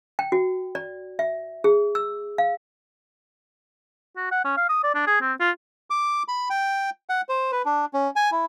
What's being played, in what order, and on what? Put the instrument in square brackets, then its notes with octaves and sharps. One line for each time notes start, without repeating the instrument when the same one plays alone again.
[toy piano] G5
F#4
D5
E5
G#4
E6
F5
[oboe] F#4
F#5
C#4
F5
D#6
D5
D4
G#4
C4
F4
[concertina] D6
B5
G5
F#5
C5
B4
D4
C#4
G#5
E4